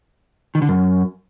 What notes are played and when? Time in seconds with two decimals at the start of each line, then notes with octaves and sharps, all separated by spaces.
0.55 D#3
0.62 D3
0.69 F#2